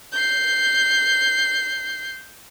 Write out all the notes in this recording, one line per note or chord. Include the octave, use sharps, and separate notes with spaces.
G6 C7